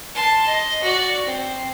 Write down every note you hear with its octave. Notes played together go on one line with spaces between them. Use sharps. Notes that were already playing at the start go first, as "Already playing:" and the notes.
A5 C6
D#5
F#4 D5
C4